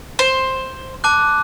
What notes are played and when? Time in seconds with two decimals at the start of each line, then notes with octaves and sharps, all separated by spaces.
0.19 C5
1.04 A5 D6 F#6